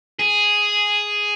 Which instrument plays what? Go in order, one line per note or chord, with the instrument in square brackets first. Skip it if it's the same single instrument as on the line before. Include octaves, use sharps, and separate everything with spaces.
[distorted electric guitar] G#4